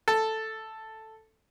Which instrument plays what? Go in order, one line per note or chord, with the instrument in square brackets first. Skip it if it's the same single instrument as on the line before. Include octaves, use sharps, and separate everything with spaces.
[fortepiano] A4